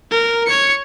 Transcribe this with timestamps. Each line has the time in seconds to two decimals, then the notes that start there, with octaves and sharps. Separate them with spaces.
0.11 A#4
0.47 C#5 C#7